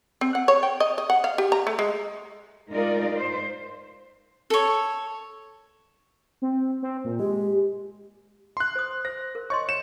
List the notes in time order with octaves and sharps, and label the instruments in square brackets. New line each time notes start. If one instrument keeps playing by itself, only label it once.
[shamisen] C4
F#5
C#5
G5
D#5
D#5
F#5
F5
G4
A#5
A3
G#3
[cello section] G#3 D#4 F4 A#4 D5
C5
[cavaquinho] A4 C#5
[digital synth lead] C4
C4
A#2
[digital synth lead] G#3 [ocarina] G4
[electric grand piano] C6 F#6
[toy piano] C5 D#6
[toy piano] C5 [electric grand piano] A#6
[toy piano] A#4
[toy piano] C#5 D#5 C6 [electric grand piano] C#6
[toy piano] C#5 [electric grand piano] C#7 E7